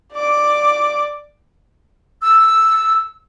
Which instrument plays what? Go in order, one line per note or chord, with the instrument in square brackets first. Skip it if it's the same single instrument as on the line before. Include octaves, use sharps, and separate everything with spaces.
[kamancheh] D5 D6
[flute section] E6